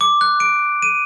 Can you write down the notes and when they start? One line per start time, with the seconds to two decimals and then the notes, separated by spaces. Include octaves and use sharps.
0.01 D6
0.21 F#6
0.40 D7
0.82 D#7